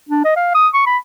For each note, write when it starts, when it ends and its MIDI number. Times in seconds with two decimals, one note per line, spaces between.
0.09 0.23 62
0.24 0.36 75
0.36 0.52 77
0.54 0.68 87
0.74 0.84 85
0.86 0.97 83